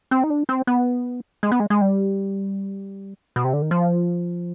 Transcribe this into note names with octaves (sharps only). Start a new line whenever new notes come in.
C4
D#4
D4
C4
B3
G#3
B3
G#3
G#3
G3
B2
C3
D3
D#3
F3